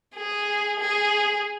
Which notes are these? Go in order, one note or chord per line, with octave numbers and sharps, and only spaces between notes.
G#4
G#4